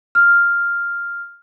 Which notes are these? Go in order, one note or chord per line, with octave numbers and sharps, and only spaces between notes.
F6